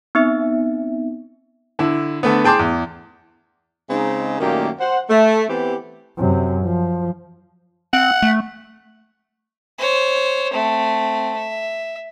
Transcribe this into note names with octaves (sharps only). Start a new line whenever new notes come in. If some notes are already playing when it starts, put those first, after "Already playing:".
B3 C4 D#4 E5
D3 E4
D3 A3 B3
G#4 G5 A5 C6 D6
E2
C#3 G#3 C4 D#4
F#2 A#2 D#3 A3 A#3 G4
C5 F#5
A3
E3 B3 C4 G4
F#2 C3
F3
C4 F#5
A3
C5 C#5
A3 C4
E5